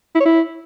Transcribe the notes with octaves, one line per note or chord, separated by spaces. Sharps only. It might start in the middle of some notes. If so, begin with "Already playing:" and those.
E4
C#5
E4